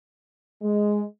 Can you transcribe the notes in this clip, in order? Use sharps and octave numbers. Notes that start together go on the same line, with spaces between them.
G#3